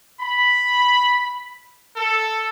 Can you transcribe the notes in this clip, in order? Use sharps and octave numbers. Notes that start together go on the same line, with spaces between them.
B5
A4